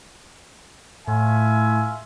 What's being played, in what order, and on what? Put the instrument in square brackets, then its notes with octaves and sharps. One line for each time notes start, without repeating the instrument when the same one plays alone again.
[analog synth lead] A2 [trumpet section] F4 E5 G#5